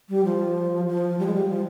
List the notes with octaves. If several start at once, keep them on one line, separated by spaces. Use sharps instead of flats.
G3
F3
F3
G3
G#3
G3
F3